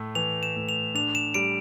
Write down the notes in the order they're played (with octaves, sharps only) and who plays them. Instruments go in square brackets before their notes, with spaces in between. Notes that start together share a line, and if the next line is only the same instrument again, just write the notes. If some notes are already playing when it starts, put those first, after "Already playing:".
Already playing: [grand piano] A2 A3
[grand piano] E3 [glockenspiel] F7
[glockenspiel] E7
[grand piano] A2
[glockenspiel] F7
[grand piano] D4 [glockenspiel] F7
[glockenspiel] E7
[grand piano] G3 [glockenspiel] D7